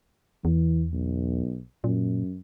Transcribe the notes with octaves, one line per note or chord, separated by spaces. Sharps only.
E2 E3
B1
F#2 A#2